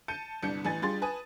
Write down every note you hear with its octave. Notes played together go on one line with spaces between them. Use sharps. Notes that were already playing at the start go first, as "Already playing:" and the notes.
A5 G6 C#7 D#7
G1 C2 D4 G6 C#7
A1 E3 G#5 A6
G3 D4 F4 G#4 C6 A6
B4 G#5 A5 D#6